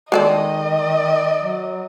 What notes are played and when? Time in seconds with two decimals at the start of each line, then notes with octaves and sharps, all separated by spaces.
0.12 D#3 G#3 A4 D5 D#5
1.39 F#3